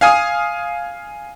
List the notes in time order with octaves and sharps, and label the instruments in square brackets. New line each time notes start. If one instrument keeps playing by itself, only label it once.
[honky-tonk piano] F5 G#5 D#6